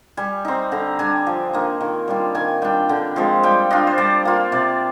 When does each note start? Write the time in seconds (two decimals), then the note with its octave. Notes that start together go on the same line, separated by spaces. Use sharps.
0.17 G3 G#5
0.45 C4 D#4
0.72 D3 A#5
0.99 G3 D4 G#5
1.27 F3
1.53 A#3 D#4
1.81 D#3
2.08 G3 D4 F4
2.35 D#3 G#5
2.62 G3 D4 G5
2.89 D3 G5
3.16 F3 G#3 C4 F5
3.43 G3 G5
3.70 D4 F4 D#5
3.87 C5
3.98 G3 D5
4.25 A#3 F4
4.52 C3 D5